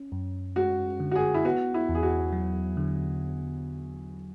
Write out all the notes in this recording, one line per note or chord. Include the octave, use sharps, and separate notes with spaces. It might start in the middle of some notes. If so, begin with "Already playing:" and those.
Already playing: C#4
F#2
G#3 F#4
D3
F#4
G#4
E4
B3 F#4
E4
E2
G#4
F#4
F#3
D3